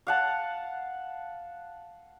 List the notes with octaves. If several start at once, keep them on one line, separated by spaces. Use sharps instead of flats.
F5 F#5 A5